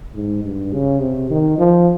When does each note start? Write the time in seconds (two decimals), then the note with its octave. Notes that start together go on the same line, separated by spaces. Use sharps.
0.15 G#2
0.44 G2
0.73 C#3
1.01 C3
1.31 D#3
1.58 F3